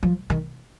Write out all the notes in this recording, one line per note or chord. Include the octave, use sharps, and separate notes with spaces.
F3
D#3